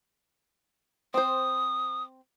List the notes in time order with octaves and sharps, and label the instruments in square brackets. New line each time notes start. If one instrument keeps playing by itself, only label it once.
[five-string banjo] C4 C5 [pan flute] D#6